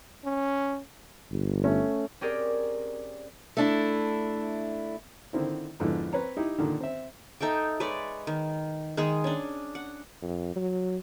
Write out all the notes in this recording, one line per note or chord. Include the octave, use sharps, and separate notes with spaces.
C#4
G1
A3 C#4
C4 C#4 G4 G#4 A#4 D5
A3 D4 E4
D3 D#3 C4 E4
F2 G#2 D3 B3 E4
C4 B4 C#5 A#5
D#4 E4 G4
A#2 D3 D#3
C4 E5
D#4 A4 E5 G5
G#3 B4 C#5 D5
D#3
D#3 G#3 G#4
C#4 D4
F#5
F2
F#3